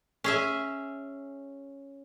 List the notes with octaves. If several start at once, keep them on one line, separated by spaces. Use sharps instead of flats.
C#4 G#4 E5